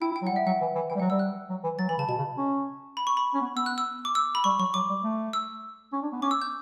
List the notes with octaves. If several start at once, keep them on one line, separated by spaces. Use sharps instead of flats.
E4 G5
E4
G5
F#3
F#5
G3
E5
F#3 F#5
E3
E3
E3 G5
G3
F#3 F#5
G3 E6
F#6
F#3
E3
F#3 A6
E3 B5
C#3 A5
B2 A5
C#3
C#4
B5
C#6
B5
C#4
B3
B3 E6
F#6
E6
D6
E6
B5
G3 C#6
F#3 C#6
F#3 D6
G3
A3
E6
C#4
D4
B3
C#4 D6
E6
G6